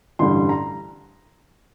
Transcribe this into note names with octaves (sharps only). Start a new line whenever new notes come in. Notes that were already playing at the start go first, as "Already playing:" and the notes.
A1 G2 D3 G3 C6
A#5